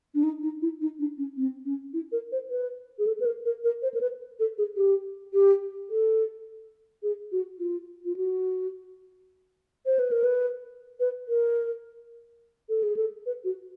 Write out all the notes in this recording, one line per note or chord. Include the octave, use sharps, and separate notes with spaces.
D4
D#4
D#4
E4
D#4
D4
C#4
C4
C#4
E4
A#4
C5
B4
G#4
A4
B4
A#4
A#4
A#4
C5
A#4
B4
A4
G#4
G4
G4
A4
G#4
F#4
F4
F4
F#4
C5
B4
A#4
B4
B4
A#4
A4
G#4
A4
B4
F#4